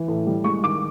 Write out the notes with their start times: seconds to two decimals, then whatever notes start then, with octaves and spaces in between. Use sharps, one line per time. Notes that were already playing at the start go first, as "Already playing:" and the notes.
Already playing: E3
0.08 A2
0.27 G3
0.44 G#3 C#6
0.63 D#3 D6